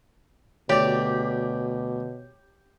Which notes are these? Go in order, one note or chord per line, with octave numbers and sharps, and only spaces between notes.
D2 B2 G4 C#5 D5